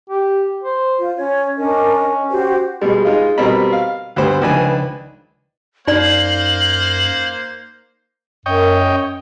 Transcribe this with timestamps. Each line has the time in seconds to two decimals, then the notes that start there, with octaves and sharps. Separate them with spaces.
0.10 G4
0.64 C5
0.98 F4
1.17 C#4 C#5
1.57 C#4 D4 A#4 D#5
2.30 F#4 G4 C5
2.81 B2 G3 G#3
3.05 G#3 D#4 F4
3.38 B2 G3 C4 A#4 D#5 B5
3.73 F5
4.16 D2 G2 B3 G4 C5
4.42 C#2 D#3 F3 D4 B4 G#5
5.87 F#2 A#3 D#4 C5 D5 F5 F#7
8.46 F#2 C#5 D#5 G5